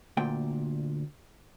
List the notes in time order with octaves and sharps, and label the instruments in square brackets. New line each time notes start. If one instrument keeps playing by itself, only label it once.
[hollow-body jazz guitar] D2 A#2 G5